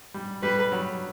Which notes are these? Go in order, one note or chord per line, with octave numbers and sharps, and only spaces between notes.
G3
G3 B4
F#3